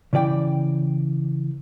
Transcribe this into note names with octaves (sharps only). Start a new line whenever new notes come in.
C#3 E3 D5 G5